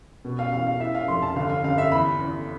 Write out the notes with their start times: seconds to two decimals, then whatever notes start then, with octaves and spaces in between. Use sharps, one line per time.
0.25 B2
0.39 F5
0.53 E2 F5
0.67 F5
0.80 E3 E5
0.95 F5
1.08 F1 C6
1.22 A5
1.36 G1 F5
1.50 F5
1.64 G1 F5
1.78 E5
1.92 E2 B5
2.20 E2